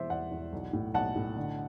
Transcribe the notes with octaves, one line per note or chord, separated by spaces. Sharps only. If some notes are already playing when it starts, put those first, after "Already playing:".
Already playing: E1 E2 C5 D5 E5
E2 D5 F#5
E2
B1
A2
B1 F#5 A5
A2
D3